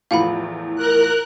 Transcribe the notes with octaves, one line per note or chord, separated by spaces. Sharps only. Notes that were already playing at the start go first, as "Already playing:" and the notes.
E2 A2 F3 F5 F#5 B5
A#4 F#6